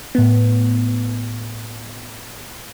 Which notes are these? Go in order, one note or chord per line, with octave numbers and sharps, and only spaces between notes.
A2 B3